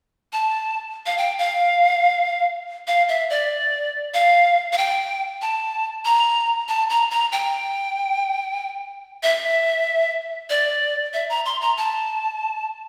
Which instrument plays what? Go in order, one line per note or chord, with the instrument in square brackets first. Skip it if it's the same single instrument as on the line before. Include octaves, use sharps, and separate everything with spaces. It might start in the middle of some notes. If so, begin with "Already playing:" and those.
[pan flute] A5
F5
G5
F5
F5
E5
D5
F5
F5
G5
A5
A#5
A5
A#5
A#5
G5
E5
D5
E5
A#5
C6
A#5
A5